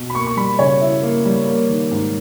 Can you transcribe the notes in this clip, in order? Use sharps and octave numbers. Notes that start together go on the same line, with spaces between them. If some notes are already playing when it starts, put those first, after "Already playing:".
Already playing: B2
B5
A#3 C#6
C#6
G3 B5
C#3 C#5
E4
A#3
G3
A#3
D#3
G#2